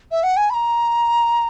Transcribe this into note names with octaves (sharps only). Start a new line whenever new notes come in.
E5
F#5
G#5
B5
A#5